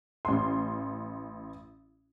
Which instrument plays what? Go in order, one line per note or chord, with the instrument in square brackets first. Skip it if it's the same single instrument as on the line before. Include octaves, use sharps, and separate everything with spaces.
[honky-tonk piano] A1 C6